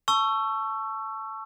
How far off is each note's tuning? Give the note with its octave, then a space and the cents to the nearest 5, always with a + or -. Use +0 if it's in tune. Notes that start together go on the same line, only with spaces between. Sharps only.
A5 -5 C#6 +0 E6 +25